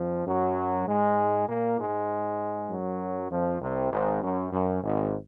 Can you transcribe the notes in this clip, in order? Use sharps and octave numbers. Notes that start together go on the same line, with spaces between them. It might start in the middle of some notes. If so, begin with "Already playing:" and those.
Already playing: F2 F3
F#2 F#3
G#2 G#3
A#2 A#3
G#2 G#3
F#2 F#3
F2 F3
C2 C3
G#1 G#2
F#2
F#2
G#1 G#2